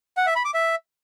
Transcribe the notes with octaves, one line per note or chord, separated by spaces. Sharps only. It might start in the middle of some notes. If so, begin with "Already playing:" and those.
F#5
E5
B5
D6
E5